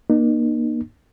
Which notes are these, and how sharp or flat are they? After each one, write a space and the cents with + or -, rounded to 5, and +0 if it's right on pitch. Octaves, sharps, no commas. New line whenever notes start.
A#3 +30 D#4 -35